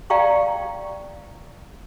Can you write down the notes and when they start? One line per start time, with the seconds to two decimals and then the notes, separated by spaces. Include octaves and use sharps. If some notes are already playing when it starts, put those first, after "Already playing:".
0.10 D5 F5 G5 A#5 C#6